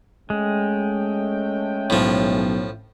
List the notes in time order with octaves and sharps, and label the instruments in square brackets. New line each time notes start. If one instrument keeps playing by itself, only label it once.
[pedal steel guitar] G#3 [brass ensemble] A3 C#4 G5
[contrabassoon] B1 [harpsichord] A2 F3